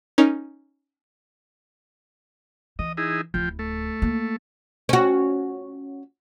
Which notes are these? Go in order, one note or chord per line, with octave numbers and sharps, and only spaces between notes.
C#4 D#4 A#4
E3 D#5
D#4 E4 G#4
D1 F3 E4 G5
A3
A#3
C#4 F#4